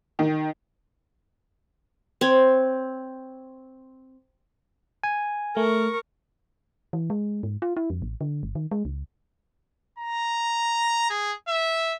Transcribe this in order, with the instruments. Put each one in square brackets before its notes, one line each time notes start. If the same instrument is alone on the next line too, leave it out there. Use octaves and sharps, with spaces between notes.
[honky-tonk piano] D#3
[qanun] C4 C#5
[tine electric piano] G#5
[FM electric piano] A3 [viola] A#4 C#6
[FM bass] E3
G#3
G#2
F4
E4
F2
A1
D3
G1
D#3
G#3
C#2
[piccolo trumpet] A#5
G#4
E5